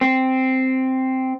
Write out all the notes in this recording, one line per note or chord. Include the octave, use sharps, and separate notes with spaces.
C4